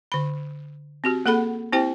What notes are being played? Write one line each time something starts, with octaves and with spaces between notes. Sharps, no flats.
D3 B5
C4 F#4 G4
A#3 G#4 A4 F#5 B5
C4 E4 G4 C5 G5